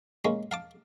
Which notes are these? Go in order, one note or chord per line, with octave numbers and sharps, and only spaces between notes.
G#3 A#3 C#4
F5 A5 D6